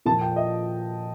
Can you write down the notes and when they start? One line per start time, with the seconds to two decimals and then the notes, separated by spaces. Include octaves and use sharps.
0.05 A#2 F3 A5
0.21 G5
0.36 D#5